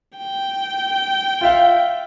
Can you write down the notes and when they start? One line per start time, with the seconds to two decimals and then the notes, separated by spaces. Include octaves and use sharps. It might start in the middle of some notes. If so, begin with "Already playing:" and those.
0.17 G5
1.41 F4 E5 F5